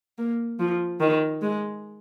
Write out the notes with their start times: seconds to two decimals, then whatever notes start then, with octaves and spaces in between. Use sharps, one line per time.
0.18 A#3
0.59 F3
1.00 D#3
1.42 G#3